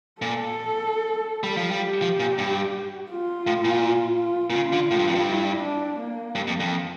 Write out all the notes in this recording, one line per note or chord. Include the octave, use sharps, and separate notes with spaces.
A#2 A4
G3
F3
G3 G4
F3
A#2
G2
F4
A2
A#2
F4
A#2
C#3 F4
D3
A2
G2
F2
G2
E4
D4
A#3
G2
F2
F2